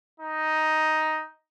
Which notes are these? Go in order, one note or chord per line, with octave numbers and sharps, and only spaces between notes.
D#4